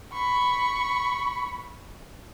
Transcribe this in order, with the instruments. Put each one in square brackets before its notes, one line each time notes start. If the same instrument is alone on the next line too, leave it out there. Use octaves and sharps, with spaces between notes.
[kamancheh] B5 C#6